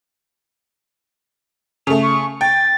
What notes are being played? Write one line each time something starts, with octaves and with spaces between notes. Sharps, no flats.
C#3 A3 F7
C#6
G5 A6